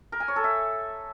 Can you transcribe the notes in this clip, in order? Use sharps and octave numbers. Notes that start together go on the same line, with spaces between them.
A#4
G#5
C#5
A4
E5